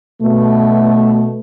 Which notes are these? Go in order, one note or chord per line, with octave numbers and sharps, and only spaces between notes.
B2 A3